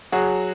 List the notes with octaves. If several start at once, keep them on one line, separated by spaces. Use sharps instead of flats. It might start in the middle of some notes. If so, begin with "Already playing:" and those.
F#3 F#4 G#4